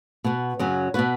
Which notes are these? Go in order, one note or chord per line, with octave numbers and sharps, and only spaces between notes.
B2 B3 F#4
F#2 C#3 F#3 C#4
B2 B3 F#4 B4